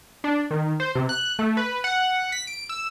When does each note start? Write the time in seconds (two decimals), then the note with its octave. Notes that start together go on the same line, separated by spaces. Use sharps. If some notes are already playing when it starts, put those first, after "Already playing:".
0.24 D4
0.51 D#3
0.80 C5
0.95 C3
1.09 F#6
1.39 A3
1.57 B4
1.84 F#5
2.32 B6
2.47 D7
2.69 E6